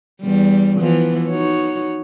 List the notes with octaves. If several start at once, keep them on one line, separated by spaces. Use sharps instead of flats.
E2 G3
E3 F3 B3
D#4 F#4 C#5